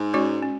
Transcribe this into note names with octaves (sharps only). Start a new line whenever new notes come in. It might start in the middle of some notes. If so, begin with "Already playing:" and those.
Already playing: G#2
G#3 C#4 F#4 C#5
C#4